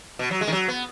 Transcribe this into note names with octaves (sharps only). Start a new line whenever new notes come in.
B2
F#3
G#3
D#3
F#3
B3